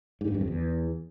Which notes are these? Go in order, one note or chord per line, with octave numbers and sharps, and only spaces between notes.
G#2
G2
F#2
F2
E2